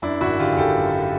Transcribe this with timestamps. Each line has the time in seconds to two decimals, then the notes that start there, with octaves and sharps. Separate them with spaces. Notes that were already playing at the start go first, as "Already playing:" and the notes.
0.02 F#2 D4 E4
0.21 G#1 E4 F#4
0.39 D3 F4 G4
0.53 G#4
0.57 G#1 G4 A4
0.76 F#2